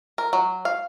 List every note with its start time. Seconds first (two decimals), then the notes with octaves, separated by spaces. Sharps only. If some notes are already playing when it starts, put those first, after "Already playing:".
0.18 A#4
0.33 F#3
0.65 F5